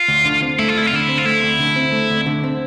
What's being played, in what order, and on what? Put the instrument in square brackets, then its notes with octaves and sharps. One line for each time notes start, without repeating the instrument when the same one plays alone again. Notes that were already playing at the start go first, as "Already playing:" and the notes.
Already playing: [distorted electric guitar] F4
[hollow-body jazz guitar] D2
D3
C4
[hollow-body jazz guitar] A3 [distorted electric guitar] E4
[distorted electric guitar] F4
[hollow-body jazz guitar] D2 [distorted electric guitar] E4
[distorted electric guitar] F4
[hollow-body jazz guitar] D3 [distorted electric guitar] E4
[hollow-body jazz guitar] C4
[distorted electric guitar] F4
[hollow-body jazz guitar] A3 [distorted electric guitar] E4
[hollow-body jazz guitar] D2
D3
C4
A3
D2
D3
C4